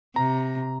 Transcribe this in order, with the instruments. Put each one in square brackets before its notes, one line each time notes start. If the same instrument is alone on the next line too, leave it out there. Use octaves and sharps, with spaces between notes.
[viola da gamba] C3 [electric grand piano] A#5